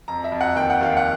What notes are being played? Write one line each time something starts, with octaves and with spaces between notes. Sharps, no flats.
F2 A#5
E5
F2
F#5
D#2 G5
F#5
D#2 F5
F#5